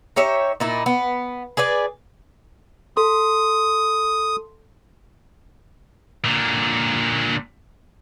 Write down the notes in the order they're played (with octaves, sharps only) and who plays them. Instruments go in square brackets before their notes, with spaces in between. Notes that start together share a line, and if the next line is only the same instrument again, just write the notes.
[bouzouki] D#4 G4 C#5 E5
A#2 D#4 E4
B3
G#4 B4 D5 G#5
[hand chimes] A4 C6 [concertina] D#6
[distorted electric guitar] A#2 D3